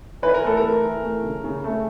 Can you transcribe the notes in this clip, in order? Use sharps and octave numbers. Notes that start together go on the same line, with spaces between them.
E3 B4
A#4
A3 A4
A#4
A3
E3
A3
C#3
C#3
A3